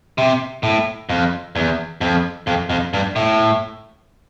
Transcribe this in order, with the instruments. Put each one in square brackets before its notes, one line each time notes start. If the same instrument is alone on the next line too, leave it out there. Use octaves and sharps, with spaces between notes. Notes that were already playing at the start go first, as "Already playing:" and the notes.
[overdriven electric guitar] C3
A2
F2
E2
F2
F2
F2
G2
A2